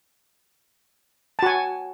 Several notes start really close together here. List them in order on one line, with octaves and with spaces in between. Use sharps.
A5 F#4 G#5